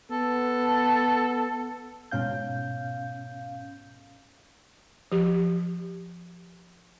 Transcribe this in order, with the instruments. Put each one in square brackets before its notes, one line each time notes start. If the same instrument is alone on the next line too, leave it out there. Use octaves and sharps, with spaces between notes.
[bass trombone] B3 [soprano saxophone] A4
[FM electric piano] G#2 B2 C#4 F5 G6
[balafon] F3 G4